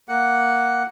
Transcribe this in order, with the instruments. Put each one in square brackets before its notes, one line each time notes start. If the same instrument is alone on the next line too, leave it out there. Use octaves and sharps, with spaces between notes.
[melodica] A#3 F#5